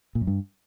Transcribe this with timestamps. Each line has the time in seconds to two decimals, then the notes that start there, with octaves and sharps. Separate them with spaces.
0.15 A#2
0.21 F#2
0.27 G2